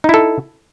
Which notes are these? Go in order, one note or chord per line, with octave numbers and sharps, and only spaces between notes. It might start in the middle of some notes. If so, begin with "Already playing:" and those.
D#4 E4 A4